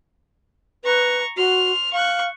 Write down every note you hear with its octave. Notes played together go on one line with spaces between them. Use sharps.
B4 A#5 C#6
F#4 C6 F6
F5 C#6 F#6